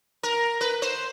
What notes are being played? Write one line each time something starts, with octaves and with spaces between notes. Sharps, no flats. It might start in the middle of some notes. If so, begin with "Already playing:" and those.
A#4
B4
C5